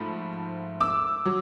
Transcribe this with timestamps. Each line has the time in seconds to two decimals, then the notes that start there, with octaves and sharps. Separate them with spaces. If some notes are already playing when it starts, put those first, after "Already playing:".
Already playing: G#2 F3 A3 B5
0.80 D6 E6
1.26 F#3